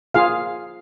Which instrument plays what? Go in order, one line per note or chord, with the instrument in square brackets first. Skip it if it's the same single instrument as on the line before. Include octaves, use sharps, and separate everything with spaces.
[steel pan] F4 G#4 F5